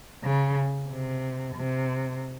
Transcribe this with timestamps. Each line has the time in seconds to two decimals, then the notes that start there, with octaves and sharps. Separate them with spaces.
0.24 C#3
0.90 C3
1.56 C3